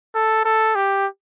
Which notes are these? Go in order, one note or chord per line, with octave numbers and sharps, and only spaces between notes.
A4
A4
G4